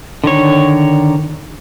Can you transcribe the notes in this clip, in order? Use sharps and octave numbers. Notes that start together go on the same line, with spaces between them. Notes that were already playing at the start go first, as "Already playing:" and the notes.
D3 D#3 C#5